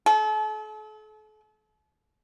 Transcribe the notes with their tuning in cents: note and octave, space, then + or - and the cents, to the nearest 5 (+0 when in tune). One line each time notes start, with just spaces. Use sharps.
A4 -40